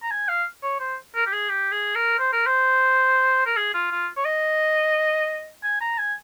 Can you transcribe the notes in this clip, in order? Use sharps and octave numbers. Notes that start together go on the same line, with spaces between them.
A#5
G#5
F5
C#5
C5
A#4
G4
G#4
G4
G#4
A#4
C5
A#4
C5
A#4
G#4
F4
F4
C#5
D#5
G#5
A#5
G#5